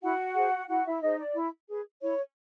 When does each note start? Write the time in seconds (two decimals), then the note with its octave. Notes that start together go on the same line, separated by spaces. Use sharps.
0.02 E4 F#4 F#5
0.35 G#4 C5
0.68 E4 F#4 F#5
0.85 E4 E5
1.02 D#4 G#4 C5 D#5
1.19 D5
1.35 E4
1.69 G#4 B4
2.02 E4 C#5